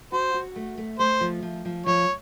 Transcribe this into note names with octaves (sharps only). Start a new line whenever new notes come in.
F#4 C5
F#4
A3
A3
A3 C5
F3
F3
F3
F3 C#5